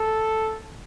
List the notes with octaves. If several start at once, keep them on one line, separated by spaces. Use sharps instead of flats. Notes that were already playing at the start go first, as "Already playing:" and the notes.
Already playing: A4